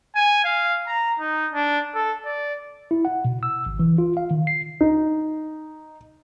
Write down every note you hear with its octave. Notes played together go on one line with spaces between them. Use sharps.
G#5
F5
A#5
D#4
D4
A4
D5
E4
F#5
B2
E6
G#1
E3
F4
F5
D#3
C7
D#4